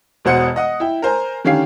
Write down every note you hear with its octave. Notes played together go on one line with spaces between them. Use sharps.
E1 B2 C5 F#5 D#6 C#7
D#5 F#5 D#6
E4 G5
A#4 C5 G#5 A#5
D3 D#3 C#4 G4 F5 C7